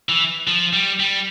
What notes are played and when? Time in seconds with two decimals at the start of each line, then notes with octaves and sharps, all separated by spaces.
0.09 E3
0.47 F3
0.73 G3
1.00 G3